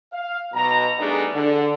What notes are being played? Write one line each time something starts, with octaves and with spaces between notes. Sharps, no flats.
F5
B1 B2 A#5
G3 A3 B3 D4 D#4 G#4
D3